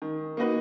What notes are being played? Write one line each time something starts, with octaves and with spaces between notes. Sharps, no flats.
D#3
A#3 D#4 F#4 B4